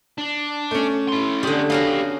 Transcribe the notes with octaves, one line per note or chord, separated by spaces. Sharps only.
D4
A3 C#4
E4 C6
D3 G3 G4 G#4
B3 C#4 F#4 G4 F5